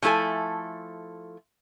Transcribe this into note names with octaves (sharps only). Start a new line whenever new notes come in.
F3 A3 E4 A4 G#5